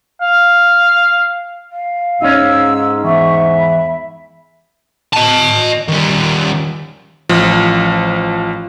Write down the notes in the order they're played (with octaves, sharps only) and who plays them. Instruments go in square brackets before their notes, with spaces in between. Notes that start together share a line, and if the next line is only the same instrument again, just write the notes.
[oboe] F5
[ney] F5
[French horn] G#2 [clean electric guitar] C#4 D#4 [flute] E6
[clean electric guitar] E2 [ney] E5 [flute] C#6
[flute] B5
[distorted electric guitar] D#5 A5
D#3 G3
[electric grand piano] A1 F3